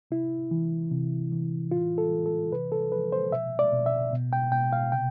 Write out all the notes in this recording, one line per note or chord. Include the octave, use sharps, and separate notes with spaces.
C3 E4
E3
C3
E3
A2 F4
A4
E3
A4
C3 B4
A4
F3 B4
C5
B2 E5
D5
B2
E5
B2
G5
B2 G5
F5
C3 G5